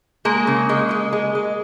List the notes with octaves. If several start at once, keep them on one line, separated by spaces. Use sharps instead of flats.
G#3 A#3
C#3
G#3
G#3
G#3
G#3